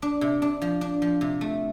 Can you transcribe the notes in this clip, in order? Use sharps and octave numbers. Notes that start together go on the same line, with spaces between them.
D4
C3
D4
F3
D4
F3
C3
A3